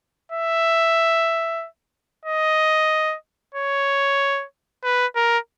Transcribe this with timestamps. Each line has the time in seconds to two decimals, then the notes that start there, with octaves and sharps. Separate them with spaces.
0.31 E5
2.25 D#5
3.54 C#5
4.84 B4
5.16 A#4